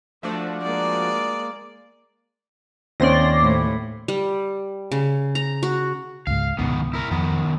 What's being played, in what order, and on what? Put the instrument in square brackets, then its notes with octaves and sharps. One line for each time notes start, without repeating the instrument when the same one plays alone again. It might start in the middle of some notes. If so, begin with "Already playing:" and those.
[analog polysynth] F3 D4 F#4 [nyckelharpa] A3
[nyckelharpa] G#3 A#3 [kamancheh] D5
[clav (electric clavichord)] D#2 [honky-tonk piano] C4 C#4 [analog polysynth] D5 C6 A#6
[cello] A2
[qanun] G3
C#3
A#5
F#4
[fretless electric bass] C#2 G#2 [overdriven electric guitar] F5
[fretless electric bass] C#2 G#2 B2 [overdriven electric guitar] D#3 B3
[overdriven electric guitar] E4 A#4
[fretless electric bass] F2 [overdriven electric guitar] D#3 B3